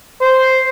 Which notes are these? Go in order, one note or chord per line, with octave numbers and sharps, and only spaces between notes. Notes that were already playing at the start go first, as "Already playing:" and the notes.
C5